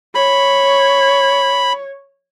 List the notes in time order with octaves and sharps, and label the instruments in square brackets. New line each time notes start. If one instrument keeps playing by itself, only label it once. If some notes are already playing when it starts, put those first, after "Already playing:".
[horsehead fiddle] C#5 [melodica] B5